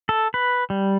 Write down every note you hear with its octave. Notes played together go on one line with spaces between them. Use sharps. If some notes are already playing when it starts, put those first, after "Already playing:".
A4
B4
G3